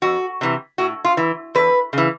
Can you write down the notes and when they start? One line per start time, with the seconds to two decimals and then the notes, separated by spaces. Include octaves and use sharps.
0.02 F2 F#4
0.41 C3 E3
0.78 A2 F#4
1.05 F4
1.17 E3
1.55 E2 B4
1.93 C#3 E3